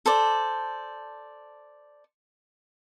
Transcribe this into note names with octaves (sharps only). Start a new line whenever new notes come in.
A4 C5 D5